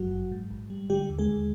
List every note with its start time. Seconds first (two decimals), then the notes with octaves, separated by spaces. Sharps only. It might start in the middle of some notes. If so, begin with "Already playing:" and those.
Already playing: G1 F#2 F#3 F#4
0.11 G1
0.32 G#2
0.51 A#1
0.70 G3
0.90 D3 G3 G4
1.10 D#2
1.19 G#3 G#4
1.29 D#2